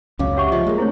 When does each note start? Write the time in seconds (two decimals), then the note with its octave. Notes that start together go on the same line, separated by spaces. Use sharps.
0.19 C#2 F#2 C#4 C#5 F5 D6
0.37 G4 C#5 E5 F#5 C#6
0.52 C#2 F3 F4 D#5
0.67 G#3 A#3
0.78 A3 C4 D4 E4 C5 C#5